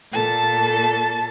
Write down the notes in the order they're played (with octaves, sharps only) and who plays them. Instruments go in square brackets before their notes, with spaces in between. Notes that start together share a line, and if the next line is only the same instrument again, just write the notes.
[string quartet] A#2 A4 A5